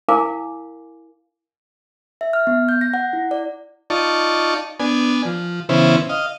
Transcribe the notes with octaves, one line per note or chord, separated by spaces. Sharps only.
E4 A#4 F5 G#5 D6
E5
F6
B3
G6
A#6
F#5
E4
D5
D#4 F4 D5 A5 C#6
B3 D4 G#5
F3
C#3 E3 B3 C#4 E4 C5
D#5 F5